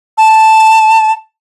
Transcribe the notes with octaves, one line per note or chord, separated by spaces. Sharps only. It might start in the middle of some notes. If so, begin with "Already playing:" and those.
A5